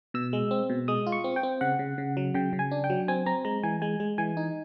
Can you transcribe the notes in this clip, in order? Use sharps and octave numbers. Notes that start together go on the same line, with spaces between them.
B2 E6
G#3
C4
B2
G#3 D#6
F4
C#6
C4
G5
C4
C#3 F#5
C#3
C#3
F#3
C#3 G5
C#3
G#5
D4
G5
F#3
C4 G#5
C4 A#5
G#3 A#5
E3 G#5
G#3 G#5
G#3
E3 G#5
D#4